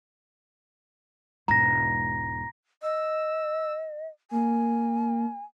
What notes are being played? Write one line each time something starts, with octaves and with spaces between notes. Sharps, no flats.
E1 G#2 A#5 A#6
D#5 E6
A#3 G#5